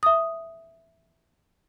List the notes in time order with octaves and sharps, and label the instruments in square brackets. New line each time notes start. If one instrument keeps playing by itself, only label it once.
[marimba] E5 D#6